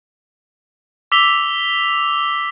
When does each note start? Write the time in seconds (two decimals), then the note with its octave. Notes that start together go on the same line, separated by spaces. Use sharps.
1.12 D6 E6 B6 F7 G7